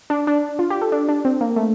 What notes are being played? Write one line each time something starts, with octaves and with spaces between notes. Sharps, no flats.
D4
D4
F4
G4
A4
D4
D4
C4
A#3
A3